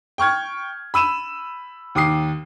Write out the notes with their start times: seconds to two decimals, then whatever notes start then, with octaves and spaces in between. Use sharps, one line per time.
0.18 G5 C#6 F6 G#6
0.94 B5 E6 D#7 E7
1.95 D#2 D6 D#6 C7